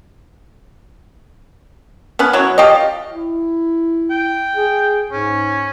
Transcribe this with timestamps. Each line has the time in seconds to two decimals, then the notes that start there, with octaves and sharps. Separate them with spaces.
2.19 B3 C#4 F#5
2.33 F#3 E4 C#5
2.58 F4 G4 C#5 D#5
3.12 E4
4.10 G5
4.56 G#4
5.12 G#2 C#4